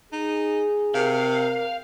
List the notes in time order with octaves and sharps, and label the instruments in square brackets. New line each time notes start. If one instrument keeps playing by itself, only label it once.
[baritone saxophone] D#4 [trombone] G#4
[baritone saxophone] C3 [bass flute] A#4 [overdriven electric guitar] F5